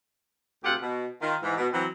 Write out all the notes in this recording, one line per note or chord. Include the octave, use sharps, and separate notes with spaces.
D2 C3 F4 G4 F#5
B2
D#3 F4
G#2 E3
B2
E3 F#3 C4